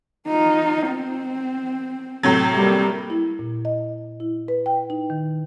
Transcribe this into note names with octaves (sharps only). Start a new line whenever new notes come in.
D#4 F4
C4
A2 C3 F#3
G3 A#3
E4
A#2
D#5
E4
B4
G5
D#4
D#3